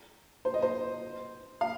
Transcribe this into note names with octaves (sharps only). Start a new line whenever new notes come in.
C5
D#5
C5
F5